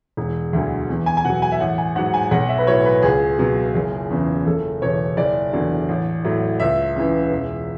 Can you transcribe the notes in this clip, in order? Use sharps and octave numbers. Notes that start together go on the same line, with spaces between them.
E1
D2 D3 F#3
E2
G#5
G#5
B2 F#3 F#5
G#5
E5
A1 F#5
G#5
G#2 F#3 F#5
G#5
B1 F#5
E5
B4
A2 F#3 C#5
B4
C#2 G#4
B2 F#3
F#1
E2 C#3
F#1 A4
E2 B2 C#5
F#1 D5
E2 D3 F#3
A1
A2 F#3
C#2 E5
C#3 E3
E1